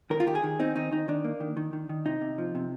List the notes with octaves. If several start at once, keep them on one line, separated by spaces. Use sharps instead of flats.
D#3 A#4
F4
D#3 G4
G#4
D#3
C4 D#4
D#3 D#4
D#3 D#4
D#3 D4
A#3
D#3
D#3
D#3
D#3
C3 D#4
C3
F3
C3